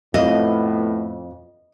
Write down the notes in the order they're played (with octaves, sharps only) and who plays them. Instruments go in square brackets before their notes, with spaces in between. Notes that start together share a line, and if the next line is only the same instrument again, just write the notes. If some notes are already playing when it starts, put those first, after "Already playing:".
[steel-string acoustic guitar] F2 [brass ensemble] A2 B3 [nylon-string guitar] D#5